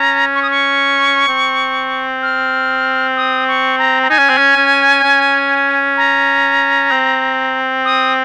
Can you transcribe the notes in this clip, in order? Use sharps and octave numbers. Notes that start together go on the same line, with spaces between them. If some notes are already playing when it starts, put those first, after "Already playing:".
Already playing: C#4 A#5
C#6
D#6
C#6
C4
F6
D#6
C#6
A#5
A#5
D#4 G#5
C#4
C4
C#4
C#4
C#4
A#5
C4
D#6